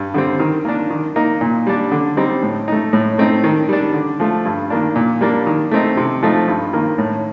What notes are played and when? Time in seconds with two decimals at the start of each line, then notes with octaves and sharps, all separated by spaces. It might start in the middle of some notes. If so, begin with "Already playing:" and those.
Already playing: G2
0.14 D3 G3 C4
0.40 D#3
0.65 A#3 D4
0.90 D#3
1.16 A#3 D#4
1.41 A#2
1.67 G3 D4
1.92 D3
2.17 G3 C4 D#4
2.43 A2
2.68 A3 D#4
2.93 A2
3.18 A3 C4 D#4
3.44 D#3
3.69 G3 D4
3.94 D3
4.20 F3 A3
4.45 G2
4.70 D#3 A#3 D4
4.96 A#2
5.21 G3 A#3 D4
5.46 D#3
5.71 A3 C4 D#4
5.97 C3
6.22 F3 A3 D#4
6.48 G2
6.73 D#3 A#3
6.98 A2